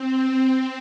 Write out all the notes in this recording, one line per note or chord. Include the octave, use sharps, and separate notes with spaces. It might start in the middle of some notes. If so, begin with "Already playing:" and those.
Already playing: C4